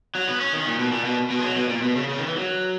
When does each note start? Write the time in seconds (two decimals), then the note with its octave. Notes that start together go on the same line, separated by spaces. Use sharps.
0.15 F#3
0.28 B3
0.40 C#4
0.53 D#3
0.66 A#2
0.79 B2
0.92 A#2
1.05 B2
1.30 B2
1.39 G#3
1.43 F#3
1.56 B2
1.69 A#2
1.82 B2
1.96 C#3
2.08 C#3
2.18 D#3
2.27 E3
2.37 F#3